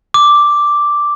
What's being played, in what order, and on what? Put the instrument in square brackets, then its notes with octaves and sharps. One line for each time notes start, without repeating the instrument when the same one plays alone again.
[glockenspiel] D6